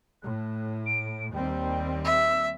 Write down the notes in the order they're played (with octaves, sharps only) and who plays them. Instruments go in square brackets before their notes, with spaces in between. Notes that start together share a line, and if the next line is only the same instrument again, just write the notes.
[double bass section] A2 [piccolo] F#6
[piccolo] D7
[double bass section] D#2 G3 C4 [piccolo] G5
[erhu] E5 [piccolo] E6